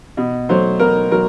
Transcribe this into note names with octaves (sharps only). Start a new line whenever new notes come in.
B2
F#3 A3 C5
B2 A#4
F#3 A#4